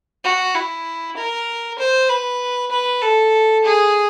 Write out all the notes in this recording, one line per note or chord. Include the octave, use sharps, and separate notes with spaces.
F#4
E4
A#4
C5
B4
B4
A4
G#4